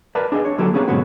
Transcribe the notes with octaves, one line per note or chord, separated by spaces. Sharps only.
A#4 B4 D5 A5 A#5
D4 G#4 D#5
C#5
D3 F#3 A#3 G4 A4
A#3 B3 C#4 D4 G#4
G#2 B2 D3 F#3 B3 F#4